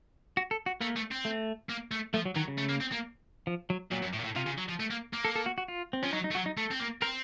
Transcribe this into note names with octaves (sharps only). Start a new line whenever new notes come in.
F#4
A4
F#4
A3 A#3
A3
C4
A3
A#3
A3
F3 A3
F#3
D#3 F#3
C#3
A3
A#3
C4
A#3
F3
F#3
A#2 F#3
F#2
A2
A#2
A2
C3 F4
C#3
F#3
F3
A3
A#3
A#3
A4
A4
F#4
F#4
F4
C4
F3 C#4
F#3 D#4
D#4
A3
F#3 F#4
D#4
A3 A4
C4
A#3
C4 A#4